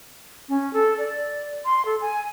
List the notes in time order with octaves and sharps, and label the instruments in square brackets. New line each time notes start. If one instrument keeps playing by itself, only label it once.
[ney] C#4
A4
D5
C6
A4
G#5